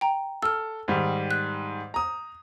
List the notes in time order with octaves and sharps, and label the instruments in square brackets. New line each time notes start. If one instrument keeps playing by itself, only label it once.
[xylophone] G5 A#5
[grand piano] A4 [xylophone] E6 F6
[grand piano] G#2 D#3 G3
[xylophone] F#6
[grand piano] A#5 D#6